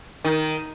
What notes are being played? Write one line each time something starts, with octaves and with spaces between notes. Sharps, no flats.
D#3